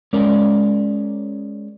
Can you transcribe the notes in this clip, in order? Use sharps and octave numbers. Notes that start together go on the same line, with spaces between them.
G#3 C#4 A#4 D5